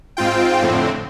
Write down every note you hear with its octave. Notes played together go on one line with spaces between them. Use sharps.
G#2 C4 F4 G5
F2 A2 D3 C4